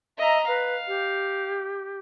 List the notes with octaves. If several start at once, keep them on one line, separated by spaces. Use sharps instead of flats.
D#5 E5 A#5
B4 F5
G4